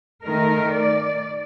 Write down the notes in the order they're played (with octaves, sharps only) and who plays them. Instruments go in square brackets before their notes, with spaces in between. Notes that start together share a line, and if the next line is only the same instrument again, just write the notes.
[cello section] D#3 A3 D#4 A#4
D5